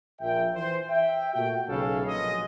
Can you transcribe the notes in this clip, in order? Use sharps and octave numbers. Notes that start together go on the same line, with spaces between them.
A#1 A#2 E5 G5
E3 C5
E5 G5
A#2 A3 F#4 G5
B1 A2 C#3 C#4 A4 F5
A#1 B2 F#3 G#3 D#5